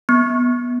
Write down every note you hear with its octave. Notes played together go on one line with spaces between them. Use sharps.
B3